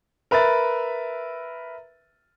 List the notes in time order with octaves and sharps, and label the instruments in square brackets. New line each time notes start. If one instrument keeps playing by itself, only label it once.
[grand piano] A#4 B4 E5 B5 A6